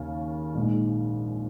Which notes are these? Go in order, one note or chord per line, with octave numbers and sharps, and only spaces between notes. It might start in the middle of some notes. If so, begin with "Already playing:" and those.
Already playing: D#2 C#3
A#1 G#2 G#3